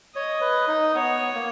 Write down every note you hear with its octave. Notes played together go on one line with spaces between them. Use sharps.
C#5 D#5
B4
D#4
B3 C#5
A#3